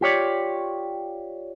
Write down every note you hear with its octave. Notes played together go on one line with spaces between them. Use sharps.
F4 G4 C#5 D5